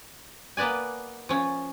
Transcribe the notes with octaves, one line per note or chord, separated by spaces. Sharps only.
A#3 B3 B4 D5 G#5
F3 C#4